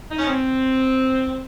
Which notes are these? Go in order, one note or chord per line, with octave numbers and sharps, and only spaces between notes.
D#4
C#4
C4